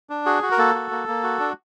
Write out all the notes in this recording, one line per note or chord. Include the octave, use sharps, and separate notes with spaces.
D4
F#4 G#4
F#4
A#4
A#3 A4
F#4
A#3
A#3
F#4
D4